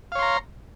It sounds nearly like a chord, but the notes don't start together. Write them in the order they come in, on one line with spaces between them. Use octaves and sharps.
F5 C#5 C6 A#5